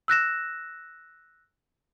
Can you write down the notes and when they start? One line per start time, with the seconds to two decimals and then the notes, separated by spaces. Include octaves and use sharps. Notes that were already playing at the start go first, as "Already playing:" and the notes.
0.08 E6 F#6 A#6 E7